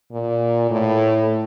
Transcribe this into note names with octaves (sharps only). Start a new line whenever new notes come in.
A#2
A2